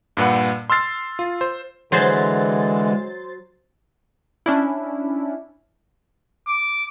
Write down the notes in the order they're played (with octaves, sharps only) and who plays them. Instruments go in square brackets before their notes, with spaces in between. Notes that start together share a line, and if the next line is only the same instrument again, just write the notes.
[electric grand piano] G2 A#2 B4 F#5
C6 E6 F6 A6 C7
F4
C5
[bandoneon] D3 E3 [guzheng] F#3 [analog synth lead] G#3 [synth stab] C5 C6 A6
[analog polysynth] C#4 D4 E4
[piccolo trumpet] D6